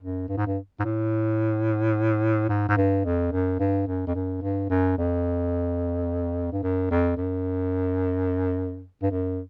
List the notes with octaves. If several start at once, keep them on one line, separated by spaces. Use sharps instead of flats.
F#2
G2
G#2
G2
G#2
A2
G#2
G#2
G2
F2
F#2
G2
F#2
F2
F#2
G2
F#2
F2
G2
F#2
F2
F#2
G2
F#2